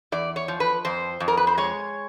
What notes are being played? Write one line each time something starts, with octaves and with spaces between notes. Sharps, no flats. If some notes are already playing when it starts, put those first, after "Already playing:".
E2 D5
C#5
F3
B4
F2 C5
F2
A#4
B4
C5
G#3 C#5